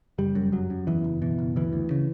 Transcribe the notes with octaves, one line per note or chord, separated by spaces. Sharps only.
F#1 G3
F#2
F#2 F#3
F#2
E2 E3
F#1
B2 E3
F#1
D2 E3
D2
C#3